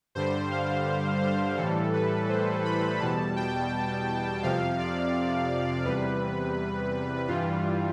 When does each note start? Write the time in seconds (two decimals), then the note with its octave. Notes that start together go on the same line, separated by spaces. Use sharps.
0.15 G2 D3 G3 C5
0.51 F5
1.22 C5
1.58 A2 E3 G3 A4
1.93 B4
2.29 C5
2.65 B5
3.00 E2 B2 G3 A5
3.36 G5
4.43 F2 C3 F3 F5
4.79 D5
5.85 E2 C3 G3 B4
7.28 G2 E3 G3 F4